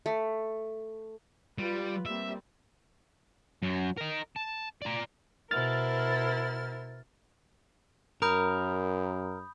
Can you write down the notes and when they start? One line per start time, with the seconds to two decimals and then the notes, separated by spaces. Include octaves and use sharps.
0.06 A3
1.58 G3 F4 G4 B4
2.06 G3 A#3 C4 E5
3.63 F#2 F#3
3.97 A#4 D#5
4.36 A5
4.82 A#4 D5
5.51 B2 E4 A#4 C5 F6 A6
8.22 F#2 A#4 B5 D#6 G6